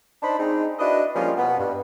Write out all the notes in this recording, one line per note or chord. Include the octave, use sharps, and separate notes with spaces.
D4 D#4 C5 A5 B5
G#3 C4 D4 D#4
D4 E4 F#4 B4 D#5
F3 G3 G#3 A#3 C#4 F4
B2 B3
G2